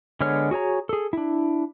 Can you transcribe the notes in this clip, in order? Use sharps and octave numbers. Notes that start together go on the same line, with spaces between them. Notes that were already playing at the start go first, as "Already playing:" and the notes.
D3 G#3 B3 C#5 F6
F#4 G#4 C#5 A#5
G#4 A4
D4 E4